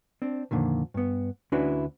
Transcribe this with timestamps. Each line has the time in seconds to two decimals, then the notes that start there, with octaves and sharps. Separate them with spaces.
0.22 C4 D4
0.51 F2 A#2 D3 D#3
0.94 G2 B3
1.52 D2 C#4 D4 E4 F#4 B4